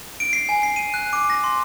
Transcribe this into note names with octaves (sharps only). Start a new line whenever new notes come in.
D7
C7
G#5
C7
D#7
F#6
D6
A#6
C6